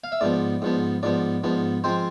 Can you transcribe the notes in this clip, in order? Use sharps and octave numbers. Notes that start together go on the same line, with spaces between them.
F5
E5
G#2 F3 B3 D5
G#2 F3 B3
G#2 F3 B3 D5
G#2 F3 B3
F3 G#3 C4 C5